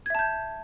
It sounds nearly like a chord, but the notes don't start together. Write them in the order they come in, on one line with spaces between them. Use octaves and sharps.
G#6 E5 A5 G6